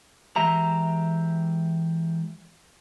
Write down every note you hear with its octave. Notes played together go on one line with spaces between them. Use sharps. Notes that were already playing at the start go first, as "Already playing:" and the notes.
E3 G#3 G4 E5 A#5